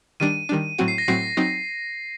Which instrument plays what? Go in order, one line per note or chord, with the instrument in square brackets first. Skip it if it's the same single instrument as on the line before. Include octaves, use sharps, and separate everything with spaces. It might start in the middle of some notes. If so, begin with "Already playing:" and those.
[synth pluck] D#3 G3 D4 [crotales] D#7
[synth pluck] D#3 G3 D4
A2 F#3 C4 F#4
[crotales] C7
A#6
[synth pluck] A2 F#3 C4 F#4 [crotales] C7
[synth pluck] F#3 C4 D#4